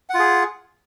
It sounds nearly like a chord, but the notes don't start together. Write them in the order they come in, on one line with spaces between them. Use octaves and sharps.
F#5 F4 G#4